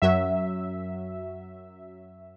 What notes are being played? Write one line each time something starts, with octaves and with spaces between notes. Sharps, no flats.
F#2 F#3 E5